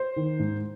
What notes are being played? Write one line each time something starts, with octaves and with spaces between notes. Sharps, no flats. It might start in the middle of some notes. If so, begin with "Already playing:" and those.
Already playing: C5
D#3
G#2